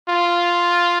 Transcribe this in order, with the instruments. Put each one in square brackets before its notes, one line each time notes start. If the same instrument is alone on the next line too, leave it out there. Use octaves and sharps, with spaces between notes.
[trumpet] F4